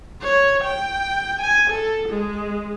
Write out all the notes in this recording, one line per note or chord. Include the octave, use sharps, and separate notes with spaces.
C#5
G5
G#5
A4
G#3